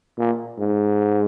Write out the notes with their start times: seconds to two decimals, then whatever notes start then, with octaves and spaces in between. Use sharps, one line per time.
0.18 A#2
0.58 G#2